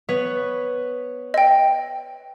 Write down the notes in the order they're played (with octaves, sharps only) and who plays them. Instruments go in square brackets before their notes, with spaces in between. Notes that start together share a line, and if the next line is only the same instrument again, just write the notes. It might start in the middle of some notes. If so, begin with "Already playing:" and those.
[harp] B3 B4 C#5
[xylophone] D#5 G5